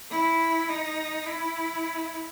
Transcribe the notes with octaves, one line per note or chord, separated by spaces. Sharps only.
E4
D#4
E4